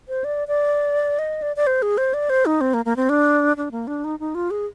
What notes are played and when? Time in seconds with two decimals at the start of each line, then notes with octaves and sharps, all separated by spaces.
0.09 C5
0.24 D5
0.48 D5
1.19 D#5
1.42 D5
1.56 D5
1.67 C5
1.82 G#4
1.98 C5
2.14 D5
2.30 C5
2.46 D#4
2.61 C4
2.74 A#3
2.85 A#3
2.96 C4
3.09 D4
3.57 D4
3.72 A#3
3.87 D4
4.04 D#4
4.20 D#4
4.35 F4
4.51 G#4